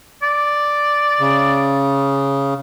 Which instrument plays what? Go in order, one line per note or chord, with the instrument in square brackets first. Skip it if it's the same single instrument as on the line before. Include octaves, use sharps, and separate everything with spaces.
[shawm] D5
[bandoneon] C#3